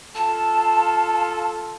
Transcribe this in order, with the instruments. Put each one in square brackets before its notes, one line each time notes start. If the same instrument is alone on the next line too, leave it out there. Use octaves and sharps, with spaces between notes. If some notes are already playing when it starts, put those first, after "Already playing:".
[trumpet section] F4 A4 [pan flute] A5